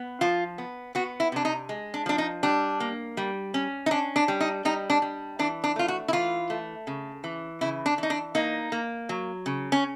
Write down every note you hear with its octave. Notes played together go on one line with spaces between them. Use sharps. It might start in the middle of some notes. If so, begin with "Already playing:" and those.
Already playing: B3
F3 F4
B3
B3 F#4
E4
C3 D4
D#4
G#3
D4
F3 D4
D#4
G3 D4
A#3
G3
C#4
D#4
C#4 D4
D4
G3
D#4
G3 D#4
D4
G3
E3 D4
D4
A3 F4
F#4
E4
E3 F4
A3
C#3
E3
C#3 E4
D4
E3 D#4
D4
A#3 D#4
A#3
F#3
C#3
C#4